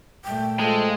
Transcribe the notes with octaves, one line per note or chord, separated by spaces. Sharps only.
A#2 A3 G5
F3 G#3 A4